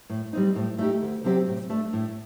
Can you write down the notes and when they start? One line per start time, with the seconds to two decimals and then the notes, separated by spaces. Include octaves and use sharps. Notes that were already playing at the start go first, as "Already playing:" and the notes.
0.10 A2
0.33 G3 C4 D#4
0.55 A2
0.79 A3 D#4 G4
1.02 D2
1.24 C3 F#3 C4 G4
1.47 A2
1.70 A3 D4
1.93 A2